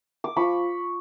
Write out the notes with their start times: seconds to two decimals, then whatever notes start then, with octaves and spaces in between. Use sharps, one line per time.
0.24 D6
0.36 F3 B5 C#6